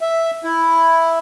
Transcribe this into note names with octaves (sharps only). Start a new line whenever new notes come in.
E5
E4